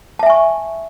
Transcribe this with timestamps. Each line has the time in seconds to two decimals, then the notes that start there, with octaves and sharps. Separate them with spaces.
0.19 A5
0.23 E5
0.26 G#5
0.30 C#6